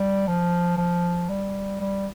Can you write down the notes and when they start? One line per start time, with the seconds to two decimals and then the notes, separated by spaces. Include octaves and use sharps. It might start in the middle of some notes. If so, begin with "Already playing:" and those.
Already playing: G3
0.27 F3
0.77 F3
1.29 G3
1.80 G3